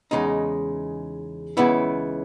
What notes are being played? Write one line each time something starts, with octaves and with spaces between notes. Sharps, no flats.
E2 C#3 G#3 D#4
C#2 C#3 E3 B3 E4